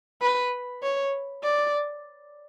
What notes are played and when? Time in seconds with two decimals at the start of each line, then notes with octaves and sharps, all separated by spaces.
0.21 B4
0.83 C#5
1.43 D5